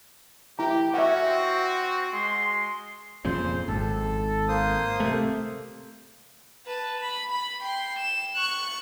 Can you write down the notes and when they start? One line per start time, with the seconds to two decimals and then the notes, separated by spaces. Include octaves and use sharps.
0.59 E4 G4 A#5
0.94 C#4 F#4 E5 F#5
1.25 C4
2.13 G#3 C6
3.25 F2 A#2 C#3 C5
3.68 G#1 A4
4.48 A#3 C5 D#6
5.00 C3 A3
6.67 B4 A5
6.99 B5
7.31 B5
7.62 G5 C6
7.99 E7
8.36 C#6 F#6